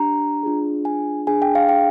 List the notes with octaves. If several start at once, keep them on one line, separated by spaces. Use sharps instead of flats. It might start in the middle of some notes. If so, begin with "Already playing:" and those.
Already playing: D4 G4 A#5
D4 F4 G#4
G#5
D4 G#4 G#5
G5
F5
G5